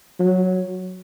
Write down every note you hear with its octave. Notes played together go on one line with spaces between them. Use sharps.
F#3